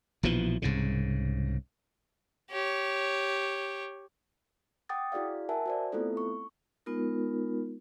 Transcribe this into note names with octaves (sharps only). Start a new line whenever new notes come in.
A#1 B2 E3 F3
C2 G#2 C#3
G4 C#5
F#5 G5 D6 D#6 A6
E4 F#4 G#4 D5 F5
A#4 E5 F#5 G#5 A5
F#4 C5 D5
A3 B3 C4 E4 F4 A4
C#6
G#3 B3 D#4 F4 A#4